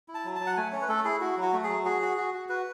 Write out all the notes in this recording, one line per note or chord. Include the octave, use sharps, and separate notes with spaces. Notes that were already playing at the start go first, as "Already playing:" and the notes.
E4
A5
F#3
F#3 A5
F#5
A3 G#5
C#4 C#5
B4
A3 A4
E4 G#4
E4 F#4
F#3
F#4
A3
G#4
F#3
F#4 G#4
F#4
F#4
F#4
F#4 B4